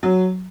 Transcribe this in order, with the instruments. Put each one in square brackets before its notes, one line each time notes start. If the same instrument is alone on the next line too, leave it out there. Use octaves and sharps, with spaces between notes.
[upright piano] F#3